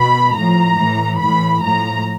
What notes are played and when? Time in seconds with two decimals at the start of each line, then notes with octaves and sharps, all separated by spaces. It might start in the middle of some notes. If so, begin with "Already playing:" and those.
Already playing: B2 B5
0.36 A2 F3 A#5
0.78 A2 E3
1.21 A2 E3 B5
1.62 A2 F3 A#5